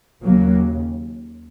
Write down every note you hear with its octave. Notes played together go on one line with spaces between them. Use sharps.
D#2 C#3 F#3 A#3